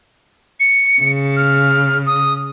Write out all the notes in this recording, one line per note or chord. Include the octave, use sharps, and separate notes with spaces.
C#7
C#3
F6
D#6